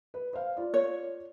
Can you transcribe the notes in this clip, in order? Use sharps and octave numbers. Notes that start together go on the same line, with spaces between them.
B4
C5 F5
F4 D5
C#5